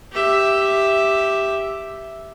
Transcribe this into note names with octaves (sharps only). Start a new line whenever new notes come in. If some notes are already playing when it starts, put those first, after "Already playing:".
G4 E5